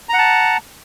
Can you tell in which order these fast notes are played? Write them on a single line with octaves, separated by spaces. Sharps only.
A#5 F#5 A5